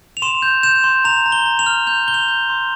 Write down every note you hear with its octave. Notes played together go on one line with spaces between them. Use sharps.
F7
C6 E7
G6
G6 E7
C6
A#5 F7
A#5
G7
A#5
F7
F6
G6 F7
G6 G7
F7
G6
C6